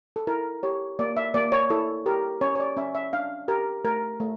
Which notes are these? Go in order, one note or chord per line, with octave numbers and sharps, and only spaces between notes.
A4
E4 A#4
G4 C#5
A#3 D5
E5
A#3 D5
C#5
E4 A4
G4 A#4
C#4 C#5
C#5
D5
C#4 E5
E5
D4 F5
G4 A#4
A3 A#4
A3